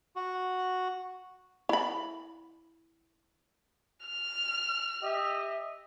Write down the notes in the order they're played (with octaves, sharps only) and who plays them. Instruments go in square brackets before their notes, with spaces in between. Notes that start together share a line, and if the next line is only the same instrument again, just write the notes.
[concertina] F#4
[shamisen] E4 B5
[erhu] F6
[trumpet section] G4 D#5 E5